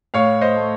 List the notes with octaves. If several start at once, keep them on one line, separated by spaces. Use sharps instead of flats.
A2 C#5 F5
C5 D#5
A3